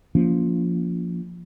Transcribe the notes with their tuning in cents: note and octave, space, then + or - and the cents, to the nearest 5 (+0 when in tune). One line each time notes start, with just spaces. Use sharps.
F3 +0 A#3 +0 C#4 +45